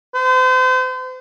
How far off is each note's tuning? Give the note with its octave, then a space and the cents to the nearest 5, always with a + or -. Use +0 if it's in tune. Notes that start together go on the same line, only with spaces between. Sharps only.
C5 -35